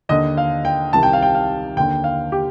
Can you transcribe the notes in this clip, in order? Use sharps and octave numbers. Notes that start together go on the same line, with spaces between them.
D#2 D3 D#5
F5
G5
C2 C3 D#3 A5
G5
F5
G5
F5
D#2 D3 G5
F5
G4